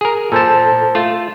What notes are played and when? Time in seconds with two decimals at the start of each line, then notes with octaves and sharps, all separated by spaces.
0.01 G#4 A#4
0.32 A#2 A4 C5 A5
0.95 A3 F4